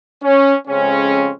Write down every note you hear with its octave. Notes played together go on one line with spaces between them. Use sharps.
C#4
F2 C#3 G#3 C4 C#4